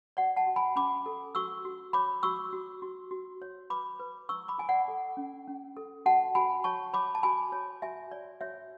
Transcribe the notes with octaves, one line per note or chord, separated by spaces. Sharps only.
F#4 D5 F#5
F#5 A5
F#4
G#5 B5
C#4 B5 D6
A4
F#4 C#6 E6
F#4
C#5 B5 D6
F#4 C#6 E6
F#4
F#4
F#4
C#5
B4 B5 D6
B4
E4 C#6 E6
B5 D6
E4 G#5
D5 F#5
A4
C#4
C#4
A4
F#4 F#5 A5
F#4 G#5 B5
C#5 A5 C#6
C#5 B5 D6
A5
F#4 G#5 B5
C#5
F#4 E5 G#5
C#5 D5
F#4 C#5 E5